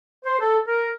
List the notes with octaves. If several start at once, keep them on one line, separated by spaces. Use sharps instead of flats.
C5
A4
A#4